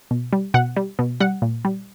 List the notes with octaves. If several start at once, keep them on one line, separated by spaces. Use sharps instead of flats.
B2
G3
B2 F#5
G3
B2
G3 F#5
A#2
G3